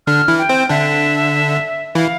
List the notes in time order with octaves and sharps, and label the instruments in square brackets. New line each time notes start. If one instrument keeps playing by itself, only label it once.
[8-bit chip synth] D3 D4 [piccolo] F6
[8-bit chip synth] E3 E4
[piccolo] G5
[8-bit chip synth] C4 C5
[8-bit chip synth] D3 D4 [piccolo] E5
[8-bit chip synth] E3 E4 [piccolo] F5